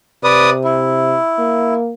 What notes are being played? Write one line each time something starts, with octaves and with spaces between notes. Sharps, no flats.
C3 B4 D5 D#6
E4
A#3